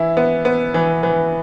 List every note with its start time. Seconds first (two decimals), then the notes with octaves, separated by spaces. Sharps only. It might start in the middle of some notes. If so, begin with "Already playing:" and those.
Already playing: E3 E4
0.17 B3
0.45 B3
0.74 E3
1.03 E3